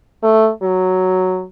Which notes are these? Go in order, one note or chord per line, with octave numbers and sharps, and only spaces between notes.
A3
F#3